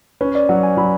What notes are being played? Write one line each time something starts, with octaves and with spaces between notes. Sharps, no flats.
C#4 B4
D5
F#3 F#5
G#5
F#3 B5